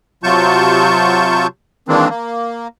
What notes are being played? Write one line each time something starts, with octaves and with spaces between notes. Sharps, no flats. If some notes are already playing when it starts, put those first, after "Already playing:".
C3 F#3 F4 A5 C#6 G6
D#3 E3 G#3 A#3 C4 D4
A#3